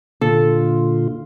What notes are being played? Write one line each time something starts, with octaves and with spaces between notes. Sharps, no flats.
A#2 D3 F4 A4